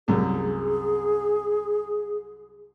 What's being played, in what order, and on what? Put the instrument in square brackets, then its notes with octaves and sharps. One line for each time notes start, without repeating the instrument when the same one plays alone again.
[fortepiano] C2 F#2 [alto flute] G#4